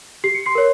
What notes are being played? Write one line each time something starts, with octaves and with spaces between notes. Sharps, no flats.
G4 C7
C#7
C6 C7
A#4 C#5